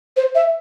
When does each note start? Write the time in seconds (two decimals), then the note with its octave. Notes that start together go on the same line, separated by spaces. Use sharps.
0.17 C5
0.35 E5